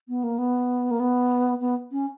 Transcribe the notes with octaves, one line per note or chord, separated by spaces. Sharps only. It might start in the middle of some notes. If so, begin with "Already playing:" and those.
B3
A#3
B3
A#3
B3
B3
C#4